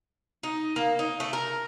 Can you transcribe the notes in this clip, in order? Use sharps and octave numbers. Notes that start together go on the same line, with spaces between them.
D#4
A#3
D#4
A3
A#4